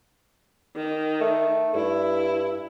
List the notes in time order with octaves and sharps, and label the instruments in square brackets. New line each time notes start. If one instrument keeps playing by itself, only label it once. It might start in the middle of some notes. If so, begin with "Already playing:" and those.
[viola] D#3
[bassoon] A3
[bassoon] G2 [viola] E4